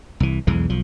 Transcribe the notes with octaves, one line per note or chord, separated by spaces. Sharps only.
C2 E3
B1 E2 E3 G#3
B1 F3